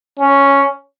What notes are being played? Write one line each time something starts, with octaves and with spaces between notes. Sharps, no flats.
C#4